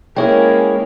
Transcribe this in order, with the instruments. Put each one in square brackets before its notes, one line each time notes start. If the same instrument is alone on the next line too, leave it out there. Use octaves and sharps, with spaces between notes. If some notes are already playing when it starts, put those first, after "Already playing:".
[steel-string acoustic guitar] G#3 E4 G#4 [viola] A#3 C#4 [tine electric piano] C#5 G5